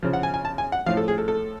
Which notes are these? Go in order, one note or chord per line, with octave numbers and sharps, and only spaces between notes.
C#3 F3
F#5
G#5
G#5
A5
G#5
F#5
A2 F3 F5
A4
G#4
A4
A4